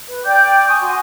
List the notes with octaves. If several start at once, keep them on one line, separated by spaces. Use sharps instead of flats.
B4
D5 G5 D6 G6
G#5 C#6 D#6
F#4 G#5 C6